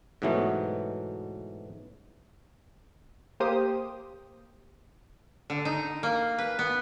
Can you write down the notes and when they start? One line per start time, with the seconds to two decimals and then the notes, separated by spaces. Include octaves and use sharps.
0.22 G#2 B2 E3 F#3 A3 B3
3.40 A#3 G4 C5 D#6
5.50 D3
5.65 D#4
6.03 A#3
6.39 B4
6.59 B3